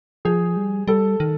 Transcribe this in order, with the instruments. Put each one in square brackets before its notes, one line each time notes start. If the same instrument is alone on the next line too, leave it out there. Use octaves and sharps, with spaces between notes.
[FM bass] F3 [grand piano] G#4
[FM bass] G3
[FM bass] G3 [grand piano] A4
[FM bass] D#3